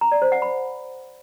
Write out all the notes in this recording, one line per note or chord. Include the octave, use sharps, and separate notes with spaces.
A#5
D5
C5
F#5
B5